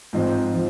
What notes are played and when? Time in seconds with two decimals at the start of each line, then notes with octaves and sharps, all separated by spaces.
0.13 G#2 F3 C4 D#4
0.54 F3